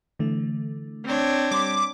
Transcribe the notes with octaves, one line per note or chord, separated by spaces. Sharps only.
D3 E3 A3
C4 D4 C#5
G3 C6 D6 B6